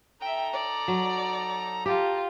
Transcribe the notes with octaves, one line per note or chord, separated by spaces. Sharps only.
D#4 A4 E5 G5 A#5
D5
F#3
F4 G4 A4 A5 A#5